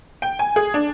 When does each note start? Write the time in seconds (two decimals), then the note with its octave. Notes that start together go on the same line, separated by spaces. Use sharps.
0.22 G5
0.39 G#5
0.56 G#4
0.74 D4